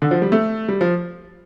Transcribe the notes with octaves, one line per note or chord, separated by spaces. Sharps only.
D3
F3
G3
A3
G3
F3